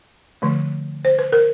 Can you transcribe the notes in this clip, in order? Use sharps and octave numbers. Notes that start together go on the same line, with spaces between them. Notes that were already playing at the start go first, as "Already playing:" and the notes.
D3 F3 A3
C5
B4
A#4